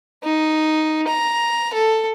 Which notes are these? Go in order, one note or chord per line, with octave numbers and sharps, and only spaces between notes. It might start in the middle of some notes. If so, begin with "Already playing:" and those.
D#4
A#5
A4